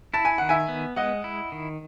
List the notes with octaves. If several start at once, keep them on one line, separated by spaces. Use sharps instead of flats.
E4 A5
G#5
D#3 F#5
E5 G#5
B3
G#3 D#5 F#5
E4
D#3